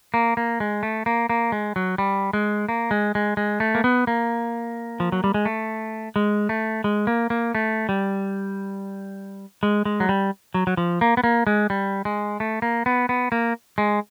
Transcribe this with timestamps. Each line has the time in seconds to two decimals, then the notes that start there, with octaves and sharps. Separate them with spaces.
0.14 A#3
0.37 A#3
0.60 G#3
0.83 A3
1.06 A#3
1.30 A#3
1.52 G#3
1.76 F#3
1.98 G3
2.33 G#3
2.69 A#3
2.91 G#3
3.15 G#3
3.37 G#3
3.60 A3
3.75 A#3
3.84 B3
4.07 A#3
5.00 F3
5.12 F#3
5.24 G3
5.34 G#3
5.45 A3
6.16 G#3
6.49 A3
6.84 G#3
7.07 A#3
7.30 A#3
7.55 A3
7.89 G3
9.63 G#3
9.85 G#3
10.00 F#3
10.09 G3
10.54 F#3
10.67 F#3
10.77 F3
11.01 A#3
11.17 B3
11.24 A#3
11.47 G#3
11.70 G3
12.05 G#3
12.40 A3
12.62 A#3
12.86 B3
13.09 B3
13.32 A#3
13.78 G#3